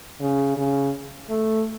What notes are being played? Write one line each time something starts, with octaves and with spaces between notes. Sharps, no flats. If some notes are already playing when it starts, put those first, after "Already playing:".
C#3
C#3
A3